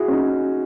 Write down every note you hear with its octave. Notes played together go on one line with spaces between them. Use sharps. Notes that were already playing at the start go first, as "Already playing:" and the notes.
Already playing: E4 F#4 G#4
C#4
D#4